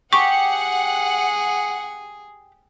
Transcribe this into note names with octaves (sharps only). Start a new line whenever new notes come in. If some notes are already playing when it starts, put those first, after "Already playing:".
G4 G#4 F#5 C#6